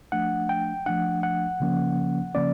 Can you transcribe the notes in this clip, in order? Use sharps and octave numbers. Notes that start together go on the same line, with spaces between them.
F3 A3 D4 F#5
G5
F3 A3 D4 F#5
F#5
C#3 F3 A#3 C#4
C#3 F3 A#3 C#4 D5